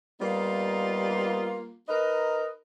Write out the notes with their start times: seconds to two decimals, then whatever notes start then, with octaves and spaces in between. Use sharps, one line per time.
0.21 G3 A#3 B3 D#4 F4
1.88 D#4 A#4 B4 D#5